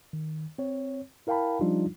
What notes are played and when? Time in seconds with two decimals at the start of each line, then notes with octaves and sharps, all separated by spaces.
0.13 D#3
0.59 C4 C#5
1.27 E4 A#4 F5 G5 A5 B5
1.61 F3 G3 D4 D#4 F4